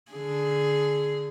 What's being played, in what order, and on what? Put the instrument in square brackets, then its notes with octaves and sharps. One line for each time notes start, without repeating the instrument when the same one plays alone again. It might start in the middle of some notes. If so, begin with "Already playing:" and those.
[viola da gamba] D3 G#4